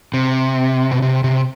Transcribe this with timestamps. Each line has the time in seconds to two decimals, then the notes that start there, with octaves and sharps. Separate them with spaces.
0.14 C3
0.91 B2
1.02 C3
1.24 C3